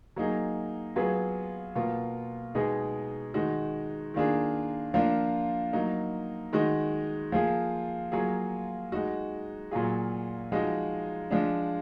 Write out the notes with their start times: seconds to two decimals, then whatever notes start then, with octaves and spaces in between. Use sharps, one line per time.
0.16 F#3 A#3 D#4 G#4
0.96 F#3 B3 F4 G#4
1.75 B2 A#3 F4
2.55 B2 G#3 D#4 G#4
3.34 D#3 G#3 D#4 F#4
4.14 D#3 A#3 D4 F4 G#4
4.94 F3 A#3 D4 F4
5.73 F#3 A#3 D#4
6.53 D#3 G#3 D#4 F#4
7.32 F3 A#3 F4 G#4
8.12 F#3 A#3 F4 G#4
8.92 G#3 D#4 F#4
9.71 A#2 F#3 A#3 F4 G#4
10.52 F3 G#3 D#4 F#4
11.31 F3 G#3 D4